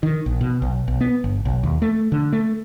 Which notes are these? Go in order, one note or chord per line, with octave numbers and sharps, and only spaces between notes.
D#3
A#1
B2
B1
B1
B3
G1
B1
D#2
A3
D3
A3